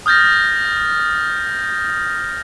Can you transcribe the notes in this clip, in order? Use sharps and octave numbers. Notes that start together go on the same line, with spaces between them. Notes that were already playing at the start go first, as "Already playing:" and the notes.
D#6 F6 G6 A6 A#6